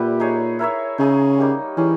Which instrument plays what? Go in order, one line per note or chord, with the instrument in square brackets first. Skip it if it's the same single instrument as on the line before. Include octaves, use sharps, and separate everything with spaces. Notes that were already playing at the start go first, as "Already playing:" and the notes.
Already playing: [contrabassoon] A#2 [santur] G3 B3 E4 G4 B4
[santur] D#4 G#4 C#5
E4 A#4 C#5 E5
[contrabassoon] C#3 [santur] D#4 G#4 D#5
[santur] G3 A#3 D#4
[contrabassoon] E3 [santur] G3 C#4 G#4